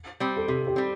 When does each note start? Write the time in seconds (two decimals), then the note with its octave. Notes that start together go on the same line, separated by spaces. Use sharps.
0.20 G3 C4
0.36 A4
0.48 C3 G4
0.67 G4
0.76 G3 C4